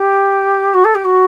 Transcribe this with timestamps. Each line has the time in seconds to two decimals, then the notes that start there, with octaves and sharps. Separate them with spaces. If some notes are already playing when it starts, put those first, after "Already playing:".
Already playing: G4
0.74 F#4
0.84 A4
0.95 G4
1.04 F#4